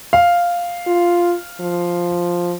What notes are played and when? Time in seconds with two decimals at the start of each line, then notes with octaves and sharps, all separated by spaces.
0.13 F5
0.87 F4
1.61 F3